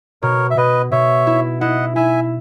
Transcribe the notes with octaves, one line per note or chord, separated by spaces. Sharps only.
B2 A#4 C#5
E5
B2 B4 D#5
B2 C#5 E5
E4
E4 D#5 F#5
E4 E5 G#5